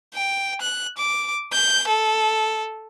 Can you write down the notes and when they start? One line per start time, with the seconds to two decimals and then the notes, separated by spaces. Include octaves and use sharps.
0.14 G5
0.61 F#6
0.98 D6
1.53 G6
1.88 A4